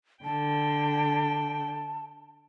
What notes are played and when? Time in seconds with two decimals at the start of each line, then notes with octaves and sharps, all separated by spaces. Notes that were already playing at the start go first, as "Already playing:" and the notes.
0.24 D3 G5 A5